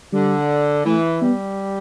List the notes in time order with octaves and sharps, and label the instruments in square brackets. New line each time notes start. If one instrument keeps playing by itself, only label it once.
[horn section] D3 [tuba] G3
[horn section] E3 [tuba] A3
[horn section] G3 [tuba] B3